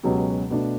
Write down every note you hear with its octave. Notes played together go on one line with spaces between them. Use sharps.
C#2 B2 F#3 C#4 G4
B2 A3 D4